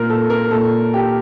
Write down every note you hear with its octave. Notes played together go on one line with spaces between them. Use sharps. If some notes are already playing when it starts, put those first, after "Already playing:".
Already playing: A#2 A#4
A4
A#4
A#2 A4
G4